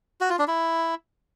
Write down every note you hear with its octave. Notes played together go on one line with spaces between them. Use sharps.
F#4
F4
D4
E4